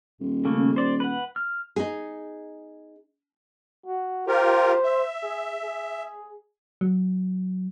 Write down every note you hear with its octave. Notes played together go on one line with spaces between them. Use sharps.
D#1
C#3 A3 A#3
C5 D5
B4 F#5
F6
D#4 G#4
F#4
F4 G4 A#4 C5
E5
G#4
G#4
F#3